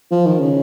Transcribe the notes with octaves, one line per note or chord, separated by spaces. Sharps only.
F3
D#3
C#3